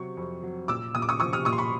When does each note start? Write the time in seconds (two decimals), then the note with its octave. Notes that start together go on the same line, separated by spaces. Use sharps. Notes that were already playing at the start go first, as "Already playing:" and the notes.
Already playing: C3 F#3 C#6
0.17 F2
0.43 F#3
0.68 A#2 D6 E6
0.95 A#2 D#6
1.02 D6
1.09 C#6 D#6
1.20 F3 C#6 D#6
1.33 D#6 F6
1.45 A#2 C#6 D#6
1.53 C6
1.58 B5 C#6